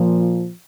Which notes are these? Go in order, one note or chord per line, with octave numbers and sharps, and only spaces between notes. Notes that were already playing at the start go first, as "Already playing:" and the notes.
Already playing: A#2 F3